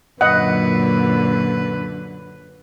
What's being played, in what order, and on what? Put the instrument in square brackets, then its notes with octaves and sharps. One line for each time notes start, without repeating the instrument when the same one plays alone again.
[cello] F#2 D3 [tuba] A#2 [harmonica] B4 [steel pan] D#5 F#5